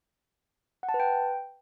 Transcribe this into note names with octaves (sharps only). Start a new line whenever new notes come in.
F#5
A5
B4
G5